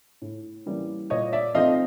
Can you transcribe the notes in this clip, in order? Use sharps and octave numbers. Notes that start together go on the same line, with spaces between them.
A2
E3 G3 A#3 C#4
A#2 C#5 D#5
D5 E5
F3 A3 C4 D#4 D#5 F5